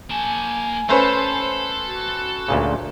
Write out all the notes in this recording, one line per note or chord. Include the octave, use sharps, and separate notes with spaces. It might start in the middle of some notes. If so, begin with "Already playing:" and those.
A#3 G#5 A5
A3 C#4 A4 B4 C5
F#4
D2 A#2 C#3